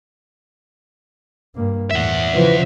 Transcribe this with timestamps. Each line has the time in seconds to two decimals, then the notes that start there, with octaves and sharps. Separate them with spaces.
1.55 G2 A#3
1.91 E2 A2 E5 F#5
2.33 C#3 E3 F3